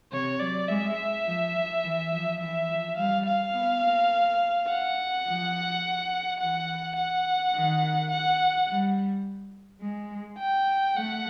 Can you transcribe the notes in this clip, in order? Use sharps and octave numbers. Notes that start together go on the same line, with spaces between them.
C3 C#5
F#3 D5
G#3 E5
F3
F3
E3
F3
E3 E5
F3
G3 F5
F5
B3
A#3
F#5
F3
E3 F#5
F#5
D#3
F#5
G3
G#3
G5
A3 F#5